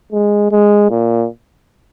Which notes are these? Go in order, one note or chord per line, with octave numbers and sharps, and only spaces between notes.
G#3
G#3
A#2